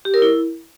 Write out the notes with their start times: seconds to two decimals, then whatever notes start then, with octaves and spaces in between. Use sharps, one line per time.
0.05 G4
0.14 A#4
0.22 E4